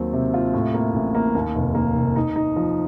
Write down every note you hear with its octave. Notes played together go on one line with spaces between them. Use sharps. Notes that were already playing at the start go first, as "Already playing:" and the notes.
Already playing: D#2 F#3 C4
C3
F4
A2
A#3
A1
A#3
D#2
F1
A#3
F1
D#4
D#4
F3